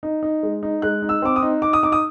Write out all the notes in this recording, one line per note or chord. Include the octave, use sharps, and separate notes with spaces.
D#4
D#4
G#3
D#4
G#3 F#6
D#4
E6
C4 D6
D#6
D#4
D#4 D6
D#6
D#4 D6
D#6